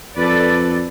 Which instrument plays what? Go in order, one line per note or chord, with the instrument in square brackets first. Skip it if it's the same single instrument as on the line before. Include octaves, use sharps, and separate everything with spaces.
[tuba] F2 [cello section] A4 B4 D5